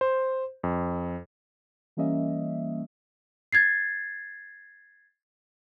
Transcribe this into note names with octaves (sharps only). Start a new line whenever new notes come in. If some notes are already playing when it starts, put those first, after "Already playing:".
C5
F2
E3 G3 A#3 C#4 D#5 E5
G#6 A6 C7